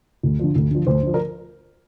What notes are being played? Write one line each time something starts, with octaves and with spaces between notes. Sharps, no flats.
D2
D3 F3
D2
D3 F3
D2 C5
D3 F3
A#4